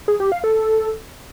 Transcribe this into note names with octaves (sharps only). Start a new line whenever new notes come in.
G#4
G4
F5
A4